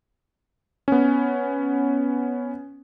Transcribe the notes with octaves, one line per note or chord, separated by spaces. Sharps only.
B3 C#4